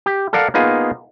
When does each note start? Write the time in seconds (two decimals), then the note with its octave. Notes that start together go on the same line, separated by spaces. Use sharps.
0.06 G4
0.33 A4 A#4 D5 F5 F#5
0.54 A#3 B3 D#4 F4 G#4